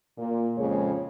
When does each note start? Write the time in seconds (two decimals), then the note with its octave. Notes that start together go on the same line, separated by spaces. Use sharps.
0.18 A#2
0.58 F2 C#3 G#3 G#4 C#5